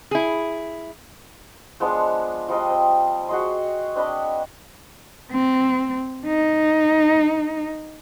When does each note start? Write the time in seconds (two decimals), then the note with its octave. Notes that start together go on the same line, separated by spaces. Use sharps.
0.11 E4 G#4
1.80 F3 G#3 B3 D4
2.48 F3 G3 D#5 C6
2.70 C4
3.29 F#4 G#4 D#5 C6
3.95 C4 D4 D#5 B5
5.32 C4
6.27 D#4